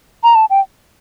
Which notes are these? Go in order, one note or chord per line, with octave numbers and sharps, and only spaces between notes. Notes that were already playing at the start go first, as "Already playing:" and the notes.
A#5
A5
G5